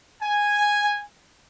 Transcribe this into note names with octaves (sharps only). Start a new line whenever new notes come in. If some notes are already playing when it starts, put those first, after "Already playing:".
G#5